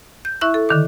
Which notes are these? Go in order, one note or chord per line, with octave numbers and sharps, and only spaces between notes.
G6
E4 E5 C#6 F#6
A4
D3 D#3 D6